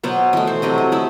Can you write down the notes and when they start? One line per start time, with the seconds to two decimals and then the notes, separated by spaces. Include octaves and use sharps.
0.03 B2 F#3 B3 C5
0.33 E3 A3 D#5
0.47 C5
0.62 C3 F#3 A3 D#5
0.78 D#5
0.92 A3 E4